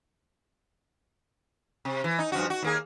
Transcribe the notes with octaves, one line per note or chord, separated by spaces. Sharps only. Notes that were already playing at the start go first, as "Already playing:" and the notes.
C3
E3
D#4
G2 F3 F#4
F#4
D#2 A#3 G#4